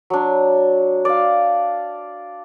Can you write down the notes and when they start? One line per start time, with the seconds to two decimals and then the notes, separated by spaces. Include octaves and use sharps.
0.10 F#3 D4
1.05 D5 F5